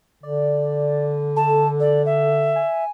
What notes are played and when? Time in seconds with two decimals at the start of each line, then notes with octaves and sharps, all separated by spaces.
0.23 D3 D5
1.36 A4 A5
1.80 A4 D5
2.05 E5
2.56 G#5